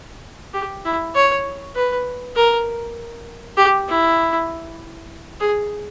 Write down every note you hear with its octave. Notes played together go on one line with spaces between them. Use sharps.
G4
E4
C#5
B4
A#4
G4
E4
G#4